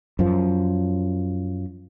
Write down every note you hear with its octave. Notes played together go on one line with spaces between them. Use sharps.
F#2 F3